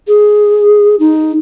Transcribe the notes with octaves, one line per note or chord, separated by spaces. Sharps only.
G#4
D#4